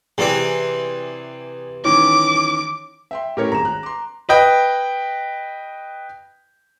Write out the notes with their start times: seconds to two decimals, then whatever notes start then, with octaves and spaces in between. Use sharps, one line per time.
0.18 C3 E3 C4 G#4 D5 G5
1.84 D#3 E3 C#4 D6
3.11 E5 G5 C6
3.37 A2 C#4 E4 G4 A#4 C#5
3.52 G#1 G#4 A#5 E7
3.65 F#6
3.83 C6 D6
4.29 B4 D#5 G5